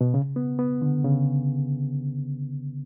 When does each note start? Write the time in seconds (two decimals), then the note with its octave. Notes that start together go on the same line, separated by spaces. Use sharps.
0.01 B2
0.14 C#3
0.36 B3
0.59 B3
0.82 D3
1.04 C#3